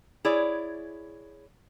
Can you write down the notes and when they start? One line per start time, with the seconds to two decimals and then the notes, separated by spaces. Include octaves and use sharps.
0.25 E4 G#4 C#5 D5